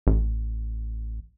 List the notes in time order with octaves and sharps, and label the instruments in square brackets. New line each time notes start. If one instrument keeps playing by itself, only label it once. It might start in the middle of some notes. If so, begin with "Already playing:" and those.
[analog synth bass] A1